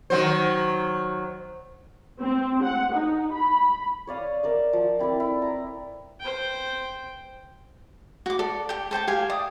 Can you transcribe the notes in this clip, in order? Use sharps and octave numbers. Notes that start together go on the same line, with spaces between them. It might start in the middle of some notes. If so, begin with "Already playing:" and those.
D#3 F#3 C5
C4
F#5
D#4
B5
C#5 D5 F5 D#6
A#4 D5 E5
F3
C4 E4 A4 D5
E4
A#5
C5 G5
F#4 D6
A4 D5
G4 G5
A4 C5 G5 A5
G4 F5 G#5
D5 D#6